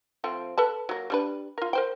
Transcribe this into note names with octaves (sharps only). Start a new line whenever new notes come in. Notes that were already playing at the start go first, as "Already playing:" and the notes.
F3 A3 C4
A4 B4 A5
F#3 A#3
G3 D4 B4
F4 A#4
A#4 C5 G5